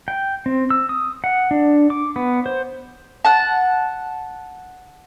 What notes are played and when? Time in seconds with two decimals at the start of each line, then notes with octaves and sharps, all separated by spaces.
0.08 G5
0.46 C4
0.70 E6
0.89 D#6
1.24 F#5
1.51 D4
1.90 D6
2.16 B3
2.46 C5
3.25 F#5 A5